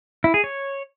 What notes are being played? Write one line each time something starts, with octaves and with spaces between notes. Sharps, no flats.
E4
G#4
C#5